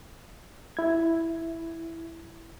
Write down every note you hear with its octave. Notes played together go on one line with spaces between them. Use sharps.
E4 G#6